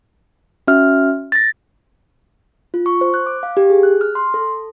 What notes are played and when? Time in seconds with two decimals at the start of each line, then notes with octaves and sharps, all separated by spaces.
0.68 C#4 F#4 E5 F6
1.32 A6 A#6
2.74 F4
2.86 C#6
3.01 C5
3.14 F#6
3.26 D6
3.43 F5
3.57 G4
3.70 G#4
3.83 F#6
4.01 F6
4.15 C6
4.34 A4